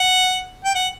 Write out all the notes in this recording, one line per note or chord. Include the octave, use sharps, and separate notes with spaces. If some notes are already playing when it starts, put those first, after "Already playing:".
Already playing: F#5
G5
F#5